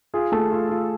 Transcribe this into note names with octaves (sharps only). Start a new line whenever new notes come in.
F4 G#4
A3 A4
F4
F4